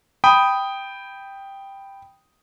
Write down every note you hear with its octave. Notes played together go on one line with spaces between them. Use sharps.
G5 B5 D#6